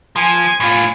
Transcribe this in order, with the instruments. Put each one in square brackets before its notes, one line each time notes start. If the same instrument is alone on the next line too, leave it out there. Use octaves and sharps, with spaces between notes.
[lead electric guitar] F3 [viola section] G#5
[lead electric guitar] A2 F4